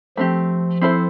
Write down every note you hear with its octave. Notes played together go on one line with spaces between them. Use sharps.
F3 A3 C4 G4
C4 E4 A4 C5